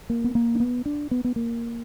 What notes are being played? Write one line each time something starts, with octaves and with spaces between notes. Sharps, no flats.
A#3
B3
A#3
D4
B3
D4
B3
B3
A#3